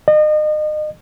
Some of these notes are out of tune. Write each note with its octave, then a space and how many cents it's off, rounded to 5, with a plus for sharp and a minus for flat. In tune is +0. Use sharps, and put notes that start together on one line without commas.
D#5 -35